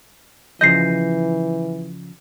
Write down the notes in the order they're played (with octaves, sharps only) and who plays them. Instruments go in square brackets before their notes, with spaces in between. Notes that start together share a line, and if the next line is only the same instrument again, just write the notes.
[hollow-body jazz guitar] C#3 F3 D#5 [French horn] E3 [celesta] G6 A#6 C7